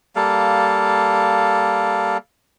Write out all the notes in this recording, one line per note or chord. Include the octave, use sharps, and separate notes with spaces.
G3 A#3 A4 F5